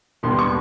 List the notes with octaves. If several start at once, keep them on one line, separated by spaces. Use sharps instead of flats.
E1 D#2 D3 G3 B3 C6
C#6